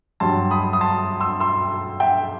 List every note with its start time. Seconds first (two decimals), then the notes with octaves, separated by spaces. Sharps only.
0.20 G2 F#3 A5 C6
0.51 B5 D#6
0.73 D#6
0.81 A5 C6
1.20 C6 E6
1.40 C6 E6
2.00 E5 G5